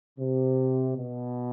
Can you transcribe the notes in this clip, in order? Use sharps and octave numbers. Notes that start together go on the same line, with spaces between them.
C3
B2